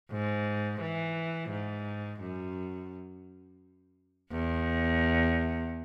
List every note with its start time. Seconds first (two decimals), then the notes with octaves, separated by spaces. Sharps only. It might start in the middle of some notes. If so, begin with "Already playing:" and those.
0.10 G#2
0.80 E3
1.50 G#2
2.21 F#2
4.31 E2